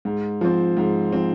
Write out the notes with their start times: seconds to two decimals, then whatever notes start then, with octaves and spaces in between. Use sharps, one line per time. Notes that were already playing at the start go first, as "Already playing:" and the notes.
0.05 G#2
0.41 F3 C4
0.77 G#2
1.12 F3 C4